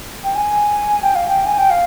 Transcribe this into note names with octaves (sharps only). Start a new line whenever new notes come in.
G5
G#5
G5
F5
G5
G#5
G5
F5